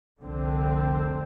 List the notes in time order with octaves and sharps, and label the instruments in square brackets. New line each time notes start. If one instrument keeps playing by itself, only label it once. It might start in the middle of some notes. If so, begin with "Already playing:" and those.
[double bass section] F1 C2 D3 C4